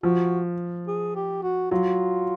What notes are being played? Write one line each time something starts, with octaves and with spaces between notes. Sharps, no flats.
F3 F#4
G#4
G4
F#4
F#3 F4